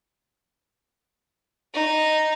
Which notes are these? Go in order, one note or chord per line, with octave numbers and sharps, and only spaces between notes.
D#4